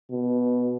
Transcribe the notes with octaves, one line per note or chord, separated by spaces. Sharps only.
B2